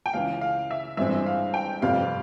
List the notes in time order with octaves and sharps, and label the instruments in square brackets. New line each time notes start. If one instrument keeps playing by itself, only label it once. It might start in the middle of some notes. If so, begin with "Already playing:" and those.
[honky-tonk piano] G5
[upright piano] C#2 C#3 E3 [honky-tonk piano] F5
[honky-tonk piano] F5
E5
[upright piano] G1 G2 E3 G#3 C4 [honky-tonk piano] E5
[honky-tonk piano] F5
G5
[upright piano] G1 F2 C3 G3 [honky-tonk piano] F5